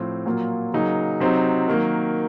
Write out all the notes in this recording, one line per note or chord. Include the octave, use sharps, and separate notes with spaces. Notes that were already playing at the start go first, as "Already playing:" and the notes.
Already playing: A2 F3 C4
A#2 F#3 A#3 F4
C#3 F#3 A#3 D#4
C3 F#3 C4 D#4
D#3 F#3 A#3